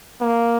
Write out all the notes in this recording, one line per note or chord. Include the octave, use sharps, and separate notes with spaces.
A#3